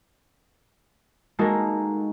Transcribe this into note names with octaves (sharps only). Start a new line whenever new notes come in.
G#3 A#3 D#4 F#4 A4 A#4